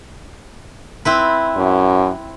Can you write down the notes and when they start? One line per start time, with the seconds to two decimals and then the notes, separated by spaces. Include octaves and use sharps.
1.05 C4 E4 B4
1.57 F#2